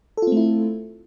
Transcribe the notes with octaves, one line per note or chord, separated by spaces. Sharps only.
A3 C4 E4 F4 A4